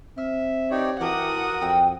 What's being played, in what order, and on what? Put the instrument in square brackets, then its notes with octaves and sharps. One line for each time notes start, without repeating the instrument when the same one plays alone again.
[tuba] C4 [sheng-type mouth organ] E5 [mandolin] F6
[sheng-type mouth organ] D#4 G4 C#5 [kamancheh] D5
[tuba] E3 [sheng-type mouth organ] F#4 A#4 [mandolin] G4 A5 D6 [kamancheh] F#5 D#6
[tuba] F2 [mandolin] G5 G#5 E6